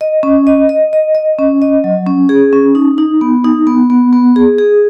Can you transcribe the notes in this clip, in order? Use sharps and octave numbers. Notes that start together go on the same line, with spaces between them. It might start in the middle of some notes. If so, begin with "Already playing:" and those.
D#5
C#4
D#5
D#5
D#5
D#5
C#4
D#5
F#3
C#4
G#4
C#4
D#4
D#4
B3
D#4
B3
B3
B3
G#4
G#4